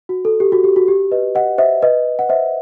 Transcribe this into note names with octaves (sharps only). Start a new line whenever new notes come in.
F#4
A4
G4
F#4
G4
F#4
G4
B4 D#5
D#5 F#5
C5 E5
B4 D#5
F#5
C5 E5